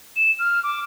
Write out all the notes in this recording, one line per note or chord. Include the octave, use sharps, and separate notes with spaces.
E7
F6
D6